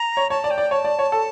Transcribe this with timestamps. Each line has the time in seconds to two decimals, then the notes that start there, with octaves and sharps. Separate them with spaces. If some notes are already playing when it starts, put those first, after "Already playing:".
Already playing: A#5
0.17 C#5
0.30 C#5 A5
0.44 D5
0.51 G5
0.58 D5
0.71 C#5 A5
0.85 D5
0.99 C#5
1.12 A4